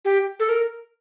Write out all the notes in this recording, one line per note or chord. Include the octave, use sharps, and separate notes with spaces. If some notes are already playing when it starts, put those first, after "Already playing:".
G4
A4
A#4